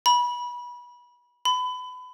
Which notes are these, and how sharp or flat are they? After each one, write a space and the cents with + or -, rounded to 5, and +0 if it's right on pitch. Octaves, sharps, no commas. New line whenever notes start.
B5 -25
B5 +30